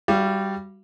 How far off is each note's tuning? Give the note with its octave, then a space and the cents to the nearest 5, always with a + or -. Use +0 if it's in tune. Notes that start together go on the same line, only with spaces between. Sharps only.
G3 +0 F#4 +15 F5 -40